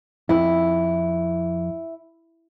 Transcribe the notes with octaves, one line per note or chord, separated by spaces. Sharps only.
F2 E4